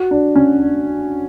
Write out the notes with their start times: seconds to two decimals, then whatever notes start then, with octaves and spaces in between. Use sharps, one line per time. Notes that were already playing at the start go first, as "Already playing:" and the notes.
Already playing: F#4
0.11 D4
0.35 C#4
0.59 D4